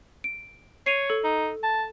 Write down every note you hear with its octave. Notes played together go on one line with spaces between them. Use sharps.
D7
C#5 C7 D#7 F7
A4
D#4
A5